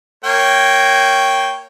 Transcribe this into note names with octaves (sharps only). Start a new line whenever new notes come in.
A#3 C#5 G5